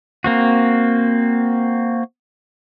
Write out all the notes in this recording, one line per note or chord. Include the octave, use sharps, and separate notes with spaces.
A#3 C4 F#4